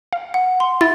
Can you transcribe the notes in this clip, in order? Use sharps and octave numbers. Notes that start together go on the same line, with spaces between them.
F5
F#5
C6
E4 A6